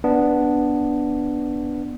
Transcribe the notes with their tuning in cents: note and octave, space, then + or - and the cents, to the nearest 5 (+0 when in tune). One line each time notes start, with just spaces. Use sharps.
B3 +0 D4 +0